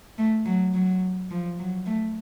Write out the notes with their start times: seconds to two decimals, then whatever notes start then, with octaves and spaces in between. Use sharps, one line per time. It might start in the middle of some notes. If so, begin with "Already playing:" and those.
0.18 A3
0.46 F#3
0.74 F#3
1.31 F3
1.59 F#3
1.86 A3